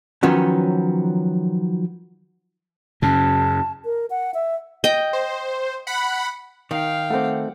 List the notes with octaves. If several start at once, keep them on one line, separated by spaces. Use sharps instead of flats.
D#3 F3 F#3 B3 C#4
F#2 C#3 A5
A#4
F#5
E5
D#5 G5
C5
F#5 B5
D#3 F5 G5
A3 C4 F#5 D6